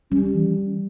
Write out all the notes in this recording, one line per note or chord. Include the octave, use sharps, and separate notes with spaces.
G3 C#4
E3